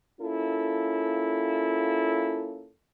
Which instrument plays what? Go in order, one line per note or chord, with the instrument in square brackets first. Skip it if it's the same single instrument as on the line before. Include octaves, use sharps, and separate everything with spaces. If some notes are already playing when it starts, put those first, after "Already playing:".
[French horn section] A#3 C#4 E4 F4 A4